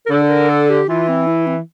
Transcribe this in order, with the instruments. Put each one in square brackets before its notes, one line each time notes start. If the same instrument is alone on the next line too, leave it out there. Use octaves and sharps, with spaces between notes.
[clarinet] A#4
[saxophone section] D3 [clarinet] A4
[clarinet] A4
A#4
A4
G4
[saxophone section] E3 [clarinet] F4
[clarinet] C4
E4
C4